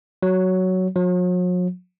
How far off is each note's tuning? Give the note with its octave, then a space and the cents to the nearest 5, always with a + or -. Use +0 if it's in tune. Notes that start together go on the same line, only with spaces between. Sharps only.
F#3 +5
F#3 -45